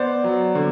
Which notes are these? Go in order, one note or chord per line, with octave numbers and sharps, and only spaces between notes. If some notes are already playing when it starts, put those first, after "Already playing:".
Already playing: B3 C5 D5
F#3
D3